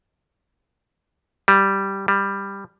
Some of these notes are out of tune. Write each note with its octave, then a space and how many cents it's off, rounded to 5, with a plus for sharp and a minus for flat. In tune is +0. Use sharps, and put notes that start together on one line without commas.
G3 -5
G3 +10